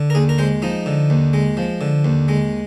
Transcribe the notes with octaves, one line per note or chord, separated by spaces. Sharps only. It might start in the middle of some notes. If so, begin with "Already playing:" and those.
Already playing: D3
A#4
D#2 G#4
A#4
G#3 C5
F3 D#4
D3
D#2
G#3
F3
D3
D#2
G#3